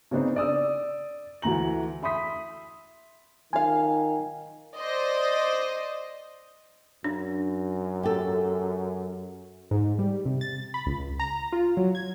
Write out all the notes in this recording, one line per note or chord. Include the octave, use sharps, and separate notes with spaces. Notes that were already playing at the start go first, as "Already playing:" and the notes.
C#3 B3 C4 D4 D#4
D5 D#6 E6
D2 E3 A3 A#5 F#7
E5 B5 C6 D#6 B6
D#3 F4 F5 G#5
C5 D5 D#5
F#2 D4
G4 A4
G#2
G3
C3
A6
B5
C#2
A#5
F4
F#3
G#6